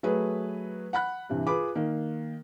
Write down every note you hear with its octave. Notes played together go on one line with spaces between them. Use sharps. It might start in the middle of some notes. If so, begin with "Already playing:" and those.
F#3 A3 G#4 B4
F#5 B5 F#6
G2 C3 E3
F4 G#4 B4 B5 D6
D#3 A#3